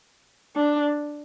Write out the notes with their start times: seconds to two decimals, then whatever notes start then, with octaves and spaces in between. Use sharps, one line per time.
0.56 D4